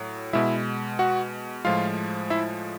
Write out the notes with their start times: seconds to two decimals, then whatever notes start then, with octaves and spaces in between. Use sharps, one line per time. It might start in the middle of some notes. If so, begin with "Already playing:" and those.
Already playing: A2 F#3
0.33 B2 G#3 E4 E5
0.99 F#4 F#5
1.65 A2 F3 G#3 F4 F5
2.30 E4 E5